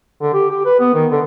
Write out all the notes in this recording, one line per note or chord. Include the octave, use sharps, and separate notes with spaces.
D3
G4
G4
B4
B3
D#3
D3